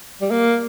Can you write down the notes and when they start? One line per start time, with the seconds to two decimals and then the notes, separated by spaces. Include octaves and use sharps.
0.21 G3
0.31 A#3